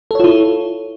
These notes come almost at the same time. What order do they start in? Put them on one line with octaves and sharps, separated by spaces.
A4 C#5 F4 E4